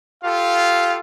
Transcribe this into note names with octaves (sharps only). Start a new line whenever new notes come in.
F4 G4 A4 F5